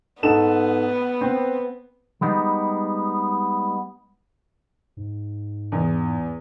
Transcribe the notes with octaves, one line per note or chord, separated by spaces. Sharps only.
G#2 B3 A4 E7
C4
G3 G#3 B3 D#4
G#2
E2